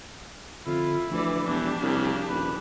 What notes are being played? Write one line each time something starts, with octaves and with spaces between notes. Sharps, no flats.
F2 D3 E4 F4
D2 E3 F3 D5
E1 E3 D4 G4
C2 C#3
D#1 B4